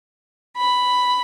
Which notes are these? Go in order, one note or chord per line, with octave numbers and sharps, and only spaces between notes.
B5